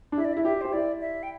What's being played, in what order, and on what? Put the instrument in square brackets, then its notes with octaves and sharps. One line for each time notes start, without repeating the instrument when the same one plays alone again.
[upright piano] D4
[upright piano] E4 [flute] E5
[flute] D5
E5
[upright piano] E4
[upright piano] G4 [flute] E5
[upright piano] G4 [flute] C5
[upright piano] E4 [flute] D5
[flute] E5
G5